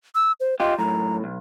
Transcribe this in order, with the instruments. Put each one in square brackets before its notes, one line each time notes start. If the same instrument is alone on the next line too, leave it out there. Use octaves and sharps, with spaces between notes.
[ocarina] E6
C5
[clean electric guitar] F4 G4 [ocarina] D#5
[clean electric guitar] F#2 A2 [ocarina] A#5
[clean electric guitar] B1